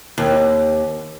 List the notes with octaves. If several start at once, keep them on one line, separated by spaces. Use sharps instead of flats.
D#2